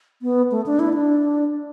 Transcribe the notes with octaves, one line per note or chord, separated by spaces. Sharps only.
B3
A3
D4
E4
D4